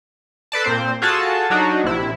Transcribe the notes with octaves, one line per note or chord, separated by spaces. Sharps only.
A4 B4 D5 A5
A#2 C4 C5
F4 F#4 G#4 A4 A5
F#3 D4 D#4 F#4
A#1 C3 E4